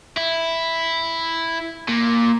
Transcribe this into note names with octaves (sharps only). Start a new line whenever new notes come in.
E4
A#2